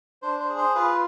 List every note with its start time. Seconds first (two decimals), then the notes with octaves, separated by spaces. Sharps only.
0.22 D4 C5
0.40 C5
0.49 G#4
0.58 C5
0.75 F4 B4